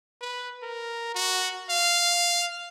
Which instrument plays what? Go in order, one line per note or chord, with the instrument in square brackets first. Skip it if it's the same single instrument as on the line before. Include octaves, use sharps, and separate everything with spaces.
[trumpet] B4
A#4
F#4
F5